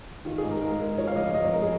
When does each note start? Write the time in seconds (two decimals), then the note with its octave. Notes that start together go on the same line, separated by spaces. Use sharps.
0.25 D#3 F4
0.38 G#4
0.43 G#2
0.50 A#4
0.62 G#2 A#4
0.81 G#3
0.98 F3 C#5
1.07 F5
1.12 C#5
1.16 F2 D#5
1.25 F5
1.34 F2 D#5
1.44 C#5
1.53 G#3 A#4
1.62 G#4